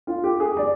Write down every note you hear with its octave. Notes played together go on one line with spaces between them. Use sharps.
F4
G4
G#4
D5